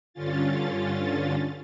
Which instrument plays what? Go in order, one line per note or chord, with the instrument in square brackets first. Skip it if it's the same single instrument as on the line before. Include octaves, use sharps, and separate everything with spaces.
[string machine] G2 D3 C#4 F4 A6